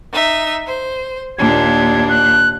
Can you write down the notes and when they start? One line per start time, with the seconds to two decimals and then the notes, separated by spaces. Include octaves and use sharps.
0.13 D#4 E5
0.67 C5
1.38 D#2 A#2 D4 G#6
2.09 F#6